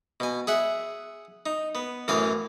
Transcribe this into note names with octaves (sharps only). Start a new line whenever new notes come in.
B2 G#5
G#4 E5 F#5
D#4
B3
F#2 A2 E3 F5 G#5 D#6